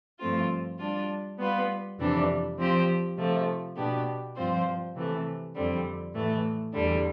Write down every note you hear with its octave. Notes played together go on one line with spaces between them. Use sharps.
G2 F3 A3 C4 F4
G3 D4 F4
G3 B3 F4 B4
F2 C3 E3 G3 D4
F3 C4 G4 C5
C3 F3 A3
B2 B3 D4 G4
G2 F3 C4 F4 C5
C3 E3 A3
F2 D3 G3 C4
A2 E3 A3
E2 D3 G3 D4